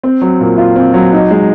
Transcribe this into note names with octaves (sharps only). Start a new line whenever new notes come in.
C4
F#3
A#2
F4
C4
F#3
D#4
G#3